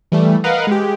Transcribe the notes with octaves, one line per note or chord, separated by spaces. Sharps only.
E3 G3 A3
A#4 B4 D#5 F5 F#5
G#3 G4